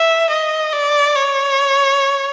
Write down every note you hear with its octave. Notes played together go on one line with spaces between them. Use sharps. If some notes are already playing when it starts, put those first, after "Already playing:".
Already playing: E5
D#5
D5
C#5